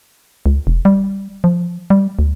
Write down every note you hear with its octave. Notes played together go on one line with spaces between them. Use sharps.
C#2
E1
G3
F3
G3
D2